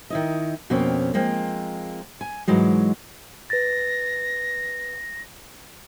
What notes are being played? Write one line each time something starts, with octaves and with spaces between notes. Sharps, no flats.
D#3 E4 D#5
F2 B2 A#3 C4 C#4
F3 G#3 A#3 C4
G#5
G#2 E3 F#3 G#3
B4 A6 A#6